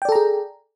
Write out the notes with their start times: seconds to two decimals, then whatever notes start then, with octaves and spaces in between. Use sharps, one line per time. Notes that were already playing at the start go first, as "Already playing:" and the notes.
0.02 G5
0.05 D5
0.09 A4
0.12 A#5
0.16 G#4